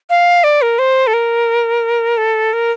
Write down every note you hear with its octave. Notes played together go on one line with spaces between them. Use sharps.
F5
D5
A#4
C5
A4
A#4
A4
A#4